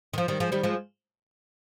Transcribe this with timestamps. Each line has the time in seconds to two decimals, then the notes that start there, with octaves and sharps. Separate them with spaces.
0.13 D#3
0.18 F3
0.28 D#3 G3
0.40 F3 G#3
0.52 D#3 G3
0.64 F3 G#3